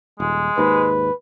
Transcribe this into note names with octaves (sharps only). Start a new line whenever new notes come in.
D#1 G#3
D#2 G#2 B4